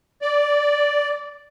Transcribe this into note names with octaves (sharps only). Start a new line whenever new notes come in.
D5